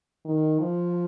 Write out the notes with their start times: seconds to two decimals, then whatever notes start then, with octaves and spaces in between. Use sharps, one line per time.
0.25 D#3
0.59 F3